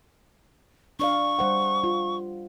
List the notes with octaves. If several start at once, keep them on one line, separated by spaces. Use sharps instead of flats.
D4 D5 F5 C#6
G3 C5 F#5
F4